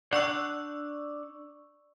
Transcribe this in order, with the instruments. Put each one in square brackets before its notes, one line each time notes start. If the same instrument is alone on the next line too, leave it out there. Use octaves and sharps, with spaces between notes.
[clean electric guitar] D4 F#5 [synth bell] D5 C#6 E6